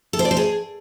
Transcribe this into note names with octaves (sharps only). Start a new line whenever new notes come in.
A4
C5
D5
C5
G#4